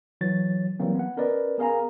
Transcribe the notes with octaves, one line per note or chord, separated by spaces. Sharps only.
E3 F#3 C#5 A6
E3 F#3 G3 A#3 C4
B3 F#5
C#4 A#4 B4 D5 D#5
B3 G#4 A#4 F5 G#5 A#5